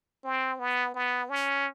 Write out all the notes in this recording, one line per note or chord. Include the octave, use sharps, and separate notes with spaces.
C4
B3
B3
C#4